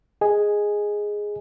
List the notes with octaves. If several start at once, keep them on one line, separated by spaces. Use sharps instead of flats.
G#4 D#5 G#5